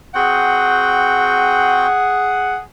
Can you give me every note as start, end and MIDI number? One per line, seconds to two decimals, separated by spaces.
0.15 1.87 60
0.15 1.87 66
0.15 2.56 68
0.15 2.56 78
0.15 1.87 79